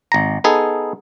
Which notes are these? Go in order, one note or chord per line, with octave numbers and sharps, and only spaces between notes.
G#1 A#5
B3 D#4 G#4 A4